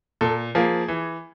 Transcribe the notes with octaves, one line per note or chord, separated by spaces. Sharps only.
A#2 A4
F3 A#3 G#4
E3